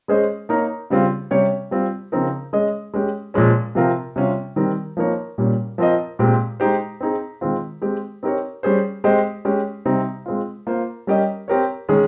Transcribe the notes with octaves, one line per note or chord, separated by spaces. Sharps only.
G#3 C#4 G#4 C5 D#5
A#3 D#4 A#4 C#5
C#3 G3 C4 F4
C3 G3 C#4 G4 C#5
G3 C4 F4
C#3 F3 C4 D#4 A#4
G#3 C#4 G#4 D#5
G#3 C#4 G4
A#2 F3 G#3 C#4
C3 F3 C4 F4 A#4
C3 G3 C#4 F4
D#3 G3 C4 D#4 A#4
F3 A#3 D#4 A#4 C#5
A#2 G3 A#3 C#4
F3 C4 F4 A#4 D#5
A#2 G#3 C4 G4
G#3 D#4 G4 C5
C4 D#4 G#4
D#3 G#3 C4 F4
G#3 C4 G4 C5
C4 D#4 G4 A#4 C#5
G3 C#4 G#4 C5
G#3 C4 G4 C5 D#5
G#3 C#4 G4
C3 G3 C4 D#4
G#3 C4 F4
A#3 F4 C5
G3 C#4 G4 A#4 D#5
C4 G4 A#4 C#5
D#3 G#3 C#4 G#4